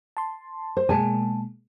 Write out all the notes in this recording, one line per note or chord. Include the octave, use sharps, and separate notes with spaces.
A5 C6
C5
B2 G#3 A#3 G#5 A5